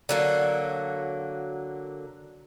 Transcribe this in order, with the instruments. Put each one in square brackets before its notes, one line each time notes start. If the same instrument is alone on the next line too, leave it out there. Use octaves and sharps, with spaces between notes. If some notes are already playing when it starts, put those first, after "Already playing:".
[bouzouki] D3 F#3 A#3